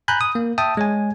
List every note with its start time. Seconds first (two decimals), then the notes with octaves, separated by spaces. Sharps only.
0.08 G#5 A#5 B5 F#6 G6
0.21 D#6
0.35 A#3
0.58 E5 G5 A5 D#6
0.77 G#3 C#5 G#5